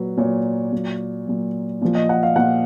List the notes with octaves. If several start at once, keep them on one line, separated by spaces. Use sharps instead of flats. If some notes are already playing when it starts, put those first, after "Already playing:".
Already playing: A#2 F#3 B4
A#2 F#3 C#5
A#2 F#3
A#2 F#3
A#2 F3
D#5
F#5
F5
A#2 F3 F#5